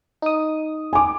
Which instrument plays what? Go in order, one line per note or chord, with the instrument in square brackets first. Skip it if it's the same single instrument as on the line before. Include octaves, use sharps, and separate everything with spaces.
[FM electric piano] D#4 D#6
[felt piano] G#5 D6